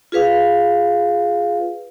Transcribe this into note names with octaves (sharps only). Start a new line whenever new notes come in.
F4 G#4 B4 F5